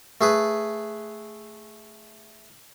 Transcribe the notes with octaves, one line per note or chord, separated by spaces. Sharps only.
A3 G#4 B4